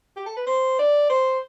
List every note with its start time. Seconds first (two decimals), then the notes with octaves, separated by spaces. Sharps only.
0.17 G4
0.26 A4
0.37 B4
0.46 C5
0.79 D5
1.10 C5